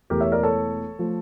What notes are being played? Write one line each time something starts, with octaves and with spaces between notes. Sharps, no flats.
E1 E2 E3 A3 G4 A#4
C#5 E5
A#4 D5
A4 C#5
F3 A3